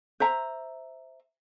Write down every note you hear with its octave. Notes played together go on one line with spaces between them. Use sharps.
C5 E5 A#5